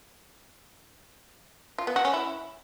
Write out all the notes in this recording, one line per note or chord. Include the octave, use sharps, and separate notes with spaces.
F4
B3
F#4
C#4
E4